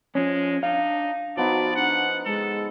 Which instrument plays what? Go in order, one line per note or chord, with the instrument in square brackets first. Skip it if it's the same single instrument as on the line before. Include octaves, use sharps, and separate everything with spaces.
[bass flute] F3 [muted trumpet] G#3 [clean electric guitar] C#4
[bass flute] D4 [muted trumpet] D#4 [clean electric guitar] F5
[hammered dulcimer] F3 B3 D#4 [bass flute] F#4 [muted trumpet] D5
[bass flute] D4 [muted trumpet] F#5
[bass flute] G#3 [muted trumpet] A4